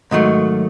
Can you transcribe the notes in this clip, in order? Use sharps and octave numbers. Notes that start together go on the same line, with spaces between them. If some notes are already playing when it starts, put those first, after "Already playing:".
G#2 D#3 F#3 A3